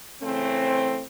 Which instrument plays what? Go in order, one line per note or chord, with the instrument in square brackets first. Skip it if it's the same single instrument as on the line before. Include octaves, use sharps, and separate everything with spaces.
[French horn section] C#3 E3 A3 C4